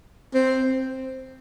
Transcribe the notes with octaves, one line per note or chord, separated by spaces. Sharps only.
C4